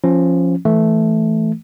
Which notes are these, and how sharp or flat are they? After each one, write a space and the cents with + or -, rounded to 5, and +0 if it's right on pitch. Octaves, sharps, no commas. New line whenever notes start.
F3 -5 C#4 -15
E3 +0 A3 -5